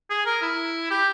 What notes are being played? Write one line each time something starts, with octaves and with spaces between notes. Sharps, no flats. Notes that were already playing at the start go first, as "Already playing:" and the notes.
G#4
A#4
E4
G4